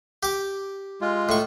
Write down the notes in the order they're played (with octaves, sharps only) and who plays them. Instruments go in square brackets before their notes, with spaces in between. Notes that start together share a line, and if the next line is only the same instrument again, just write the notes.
[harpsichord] G4 D6
[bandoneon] G#3 F4
[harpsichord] A2 C#6